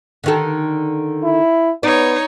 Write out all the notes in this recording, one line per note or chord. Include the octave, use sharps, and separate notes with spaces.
D3 D#3 A4
E4
B3 D#4 C#5 D5